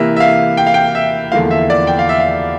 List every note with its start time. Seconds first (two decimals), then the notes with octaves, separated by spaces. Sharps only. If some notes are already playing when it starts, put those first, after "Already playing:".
Already playing: C3 E3 A#3 E5
0.16 E5
0.20 F5
0.57 G5
0.67 F5
0.74 G5
0.95 E5
1.32 E2 D3 F3 A#3 F5
1.51 E5
1.70 D5
1.87 G5
1.99 F5
2.09 E5
2.20 F5